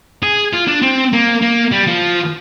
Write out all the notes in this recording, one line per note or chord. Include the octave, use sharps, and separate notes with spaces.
G#4
F4
D4
C4
A#3
A#3
G3
F3